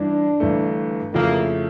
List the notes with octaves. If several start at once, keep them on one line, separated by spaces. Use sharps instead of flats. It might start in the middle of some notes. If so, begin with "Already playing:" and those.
Already playing: G2 E3 D4
G1 G2 E3 A3
F2 C#3 F3 A3 A#3 E4